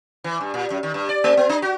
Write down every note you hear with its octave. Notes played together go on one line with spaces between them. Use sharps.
E3
G2
A#2
F#2
D#3
G2
D5
A3
B3
D4
F#4